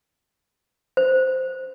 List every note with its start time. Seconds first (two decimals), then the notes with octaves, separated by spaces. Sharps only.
0.97 C5